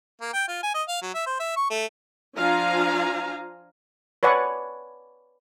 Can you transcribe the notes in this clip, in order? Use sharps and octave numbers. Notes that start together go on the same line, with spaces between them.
A#3
G5
F4
G#5
D#5
F5
F#3
E5
C5
E5
C#6
A3
F3 D4 F4 F5 G#5 A#5
B4 C#5 D5 F#5 G#5